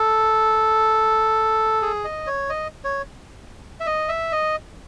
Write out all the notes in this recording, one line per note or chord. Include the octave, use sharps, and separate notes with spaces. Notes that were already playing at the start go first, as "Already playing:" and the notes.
Already playing: A4
G#4
D#5
C#5
D#5
C#5
E5
D#5
E5
D#5